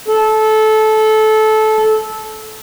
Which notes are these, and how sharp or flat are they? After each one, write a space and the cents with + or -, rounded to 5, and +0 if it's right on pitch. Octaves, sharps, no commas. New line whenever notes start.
A4 -20